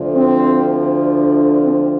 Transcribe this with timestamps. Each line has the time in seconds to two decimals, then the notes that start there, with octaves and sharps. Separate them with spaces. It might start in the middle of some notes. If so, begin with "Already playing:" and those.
Already playing: D2 D3 F3
0.14 C4
1.61 C4